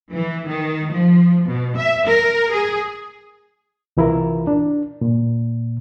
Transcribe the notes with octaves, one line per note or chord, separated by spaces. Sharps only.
E3
D#3
F3
B2
E5
A#4
G#4
C2 E3 E4 F4 A#4
D4
A#2